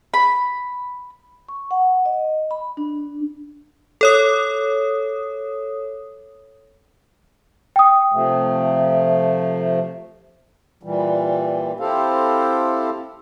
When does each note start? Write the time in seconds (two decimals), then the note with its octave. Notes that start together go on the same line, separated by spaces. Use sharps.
0.14 B5
1.48 C#6
1.71 F#5
2.06 D#5
2.51 B5
2.77 D4
4.01 A4 C#5 D#6
7.76 G5 D#6
8.13 C3 F3 A3
10.83 A#2 E3 G3
11.80 C4 E4 G4 A4 C5 F5